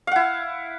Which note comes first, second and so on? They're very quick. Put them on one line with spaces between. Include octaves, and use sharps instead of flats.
F5 F#5 E4